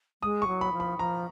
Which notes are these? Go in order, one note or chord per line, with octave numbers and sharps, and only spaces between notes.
G#3 D#6
C#6
F#3
B5
F3
B5
F3 A#5